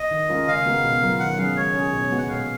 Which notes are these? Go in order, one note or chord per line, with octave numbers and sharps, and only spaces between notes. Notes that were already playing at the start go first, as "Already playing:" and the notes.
Already playing: D#5
D#3
G#3 C#4 F4 A#4
C#3 F5
G#3 B3 F#4 A#4
B2
F#3 B3 F4 A#4
D#3 F#5
F#3 C#4 G#4 F5
G#3 C#5
C#4 G#4
B2
G#3 B3 F#4
F#5
A#2 F5